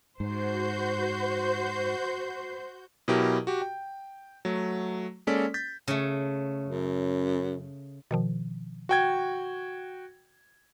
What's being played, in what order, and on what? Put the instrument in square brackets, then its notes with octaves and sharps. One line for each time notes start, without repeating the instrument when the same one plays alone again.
[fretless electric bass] G#2 [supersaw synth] F#4 G6 [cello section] C5
[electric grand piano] B2 F#3 E4 G4 A#4
F#4 G4
G5
F#3 A3
G#3 A#3 C#4 A4 D5 B6
G6 A6 B6
[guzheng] C#3 A3
[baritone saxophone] F#2
[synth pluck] B2 D#3 F3
[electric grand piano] F#4 G5 G#6